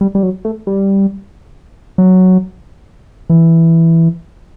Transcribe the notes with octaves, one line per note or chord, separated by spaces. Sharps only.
G3
G3
F#3
A3
G3
F#3
E3